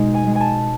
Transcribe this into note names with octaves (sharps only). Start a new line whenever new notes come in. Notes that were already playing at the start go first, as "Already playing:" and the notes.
Already playing: B2 G#3 D#4
G#5
G#3
G#5
A5